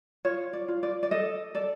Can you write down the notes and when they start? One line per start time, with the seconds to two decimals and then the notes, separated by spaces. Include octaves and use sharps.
0.25 F4 C#5
0.53 D5
0.68 F4
0.83 D5
1.03 D5
1.11 A4 D#5
1.55 A4 D5